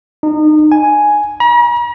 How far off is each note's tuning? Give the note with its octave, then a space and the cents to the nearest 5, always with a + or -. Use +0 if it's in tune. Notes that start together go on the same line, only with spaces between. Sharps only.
D#4 -30
G#5 +5
A#5 +45